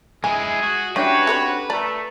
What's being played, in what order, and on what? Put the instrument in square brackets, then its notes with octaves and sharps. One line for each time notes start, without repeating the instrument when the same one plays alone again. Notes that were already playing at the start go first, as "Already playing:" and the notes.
[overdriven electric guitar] G#3 E4 [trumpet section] G#4 [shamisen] G#5
[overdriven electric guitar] F#4
[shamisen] E3 [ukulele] C#4 D4 G4 [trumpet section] F#4 C#5 [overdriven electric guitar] B4
[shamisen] D3 C4 B5
[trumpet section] A3 [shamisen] D5 [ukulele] A#5